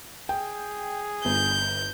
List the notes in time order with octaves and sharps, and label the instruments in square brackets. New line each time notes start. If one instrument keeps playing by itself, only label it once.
[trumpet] G#4 [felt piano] G5
[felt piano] G1 [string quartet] G6